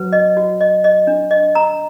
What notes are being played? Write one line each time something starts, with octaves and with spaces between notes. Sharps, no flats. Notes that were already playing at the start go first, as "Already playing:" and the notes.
Already playing: F#3 B4
D#5
F#4
D#5
D#5
D4
D#5
A#5